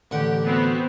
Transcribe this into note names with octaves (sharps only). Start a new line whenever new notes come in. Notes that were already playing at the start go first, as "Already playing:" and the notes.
A1 D3 G4 F#5
B3 C4 F#4